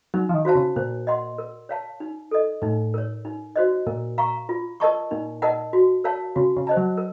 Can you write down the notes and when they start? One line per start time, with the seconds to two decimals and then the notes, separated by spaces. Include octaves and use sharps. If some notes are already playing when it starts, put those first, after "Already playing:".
0.14 F#3 D#4
0.29 F3
0.34 D#3
0.45 F#4 C5 F5 A5
0.55 C#3
0.76 A#2 C5
1.07 D#5 F#5 C6
1.38 A#4
1.69 C#5 F5 A5
2.00 D#4
2.31 A4 D#5
2.62 A2 D#4
2.94 A#4 C#5
3.25 D#4
3.56 F#4 C5 D#5
3.87 A#2 A#4
4.18 F5 A#5 C#6
4.49 F4
4.80 A#4 D#5 A5 C#6
5.11 A#2 D#4
5.42 A#4 D#5 F#5 A5
5.73 F#4
6.04 A#4 C#5 F5 A5
6.36 C#3 F#4
6.57 C#3
6.67 C5 D#5 A5
6.77 F#3
6.97 A#4